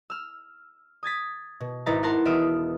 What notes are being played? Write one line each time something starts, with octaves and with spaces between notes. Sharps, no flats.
E6 F6
D#6 G#6 A6 B6
B2
G#1 D#4 E4 B4 A#5 A6
A#4 F#5 A5 A#5 C6
E1 B3 E5 D#6 F6 D7